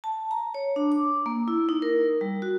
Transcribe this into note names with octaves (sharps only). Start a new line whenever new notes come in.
A5
A#5
C#5
D4
D6
A#3
E4
D#4
A#4
G3
F#4